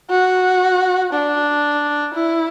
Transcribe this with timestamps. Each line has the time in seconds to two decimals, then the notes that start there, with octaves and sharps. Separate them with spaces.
0.10 F#4
1.13 D4
2.14 E4